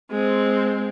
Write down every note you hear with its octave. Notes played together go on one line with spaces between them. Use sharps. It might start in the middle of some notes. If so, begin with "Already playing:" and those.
G#3 C4